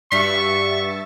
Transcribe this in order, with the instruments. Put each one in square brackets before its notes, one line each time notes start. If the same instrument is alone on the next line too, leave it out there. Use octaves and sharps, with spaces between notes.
[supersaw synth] G2 E5 A6 [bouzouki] G3 F#4 [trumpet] C#6 [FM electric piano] B6